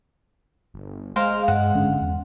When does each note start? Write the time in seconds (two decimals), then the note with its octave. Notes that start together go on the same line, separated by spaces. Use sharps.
0.74 G1
1.16 G#3 A#4 C5 F5
1.48 G2 F#5
1.75 G#1 D3 C#4
2.01 E2